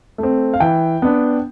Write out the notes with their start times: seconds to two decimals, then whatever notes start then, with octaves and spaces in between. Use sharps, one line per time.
0.18 A3 C4
0.54 F5
0.60 E3 G5
1.02 B3 D4